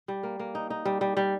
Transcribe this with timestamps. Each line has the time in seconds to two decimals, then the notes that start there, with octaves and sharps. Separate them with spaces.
0.08 G3
0.23 A#3
0.40 A#3
0.55 D#4
0.70 D#4
0.85 G3
1.01 G3
1.17 G3